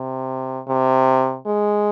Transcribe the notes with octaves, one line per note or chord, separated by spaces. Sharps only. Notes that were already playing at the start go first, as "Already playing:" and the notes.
Already playing: C3
C3
G#3